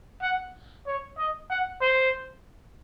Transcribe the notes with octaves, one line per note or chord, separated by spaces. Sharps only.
F#5
C#5
D#5
F#5
C5